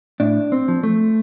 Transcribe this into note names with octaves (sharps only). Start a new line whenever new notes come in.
A2 D4
C4
F3
A3